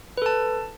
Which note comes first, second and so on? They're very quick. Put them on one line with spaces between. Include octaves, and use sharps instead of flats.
B4 A4 A5